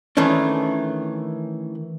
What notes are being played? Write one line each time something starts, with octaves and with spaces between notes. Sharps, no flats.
D#3 E3 A3 C#4 D4